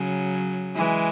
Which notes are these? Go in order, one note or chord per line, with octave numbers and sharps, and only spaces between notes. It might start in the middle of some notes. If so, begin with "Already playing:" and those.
Already playing: C#3 F#3
E3 G#3